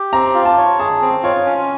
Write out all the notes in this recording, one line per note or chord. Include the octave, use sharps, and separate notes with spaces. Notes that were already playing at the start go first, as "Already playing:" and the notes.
Already playing: G4
C4 A#5
F4
A5
C#5
G#4 A5
C4
F4 C#5
C#4